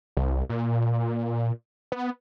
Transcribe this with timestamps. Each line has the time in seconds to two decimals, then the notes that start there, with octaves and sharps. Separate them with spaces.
0.17 C2
0.49 A#2
1.92 B3